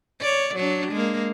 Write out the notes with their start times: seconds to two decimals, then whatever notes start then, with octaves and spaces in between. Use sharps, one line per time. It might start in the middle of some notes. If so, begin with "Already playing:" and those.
0.21 C#5 D5
0.55 F#3 D4
0.92 G#3 A#3